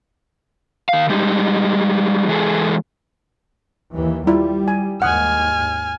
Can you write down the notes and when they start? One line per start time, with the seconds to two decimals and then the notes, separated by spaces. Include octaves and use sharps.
0.89 D#3 F5
1.10 G3 G#3 D#4 G4
2.28 E3 G#3 G#4 A4
3.92 D#2 E3
4.27 G3 E4 F4 D5
4.68 G#5
5.02 D#2 G#2 F#5 G#5 D#6 F6